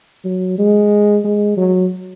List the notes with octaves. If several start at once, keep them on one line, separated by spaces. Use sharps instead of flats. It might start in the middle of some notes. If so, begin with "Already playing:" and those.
F#3
G#3
G#3
F#3